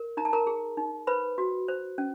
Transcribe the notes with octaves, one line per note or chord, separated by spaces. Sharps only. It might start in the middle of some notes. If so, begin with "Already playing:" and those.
Already playing: A#4
D#4 A#5
A5
A#4 A#5
G#4
D#4
B4 C5 B5
F#4
C5
C#4